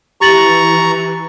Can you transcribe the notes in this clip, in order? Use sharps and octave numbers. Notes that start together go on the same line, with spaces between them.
E3 G4 A#5 C#6 A6 F#7